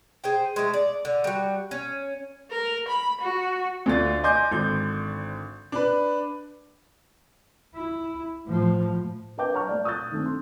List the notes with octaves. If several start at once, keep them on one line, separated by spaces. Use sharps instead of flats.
G#4 C5 G5
G#3 A3
D5
D3
G3 F#4
C#4
A#4
B5
F#4
D2 D3 F4 D5 A6
D#5 G#5 C6 D6 G6
G#1 D3 G6
D4 B4
E4
A2 F3
A#4 B4 D#5 G5 D6 G6
C#5 F#5 A5 A#5 C#6 F6
A3 D5
C#6 D#6 E6 F#6 G6 A6
D#3 A3 C4 D4
C6